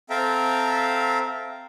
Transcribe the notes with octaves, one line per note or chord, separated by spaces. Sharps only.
C4 A4 E5 F5 G5 A#5